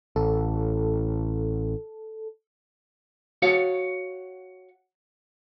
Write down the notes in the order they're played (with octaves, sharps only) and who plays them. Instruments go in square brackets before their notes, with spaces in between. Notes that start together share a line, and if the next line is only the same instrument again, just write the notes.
[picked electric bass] A1 [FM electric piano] A4
[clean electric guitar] F#4 C#5 F5